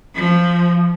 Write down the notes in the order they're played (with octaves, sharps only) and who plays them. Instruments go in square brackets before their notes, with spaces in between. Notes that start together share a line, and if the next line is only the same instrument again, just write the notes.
[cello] F3